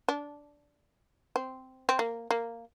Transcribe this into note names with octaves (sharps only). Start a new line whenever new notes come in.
D4
C4
C4
A#3
A#3